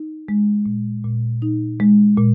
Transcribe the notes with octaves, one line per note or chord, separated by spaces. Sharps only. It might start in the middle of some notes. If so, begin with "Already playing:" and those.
Already playing: D#4
G#3
A#2
A#2
D#4
G#3
A#2